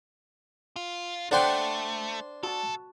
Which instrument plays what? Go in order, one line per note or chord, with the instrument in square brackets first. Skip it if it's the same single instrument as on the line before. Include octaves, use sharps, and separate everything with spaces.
[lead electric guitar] F4
[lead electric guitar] A3 [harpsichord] D4 C5 C6 [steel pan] A4 F#5 G5
[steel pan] F#4 A5 [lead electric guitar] A4